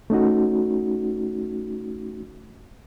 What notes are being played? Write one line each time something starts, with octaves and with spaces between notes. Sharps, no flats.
A3 C#4 D#4 F#4